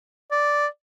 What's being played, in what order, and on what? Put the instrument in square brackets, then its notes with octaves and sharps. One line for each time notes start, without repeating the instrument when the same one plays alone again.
[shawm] D5